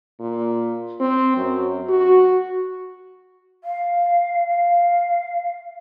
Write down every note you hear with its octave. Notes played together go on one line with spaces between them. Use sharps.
A#2
C4
F#2
F#4
F5
F5